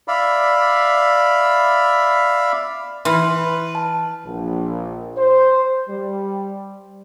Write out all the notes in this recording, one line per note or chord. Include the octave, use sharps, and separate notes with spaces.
D5 E5 F5 B5
E3 B4 C6 F6
A5
A#1
C5
G3